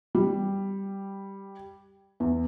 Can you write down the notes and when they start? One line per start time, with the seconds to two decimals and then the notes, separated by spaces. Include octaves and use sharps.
0.15 G3
2.20 E2